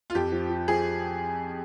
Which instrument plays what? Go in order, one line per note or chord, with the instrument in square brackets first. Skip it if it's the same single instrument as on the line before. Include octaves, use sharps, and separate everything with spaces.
[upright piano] F4
[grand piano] F2 [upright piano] G4
[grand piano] F3
F3
[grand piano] F3 [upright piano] G#4